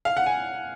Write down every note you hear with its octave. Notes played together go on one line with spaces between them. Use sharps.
F5
F#5
G#5